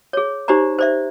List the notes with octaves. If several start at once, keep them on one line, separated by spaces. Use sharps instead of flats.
G#4 C#5
D#4 G4 C5 D5 A#5
C5 D5 E5